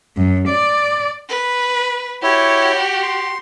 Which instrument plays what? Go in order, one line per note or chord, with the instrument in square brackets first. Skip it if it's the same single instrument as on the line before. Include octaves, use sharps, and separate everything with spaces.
[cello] F#2
D5
[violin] B4
[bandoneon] E4 C#5 [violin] F#4 G4
[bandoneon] C6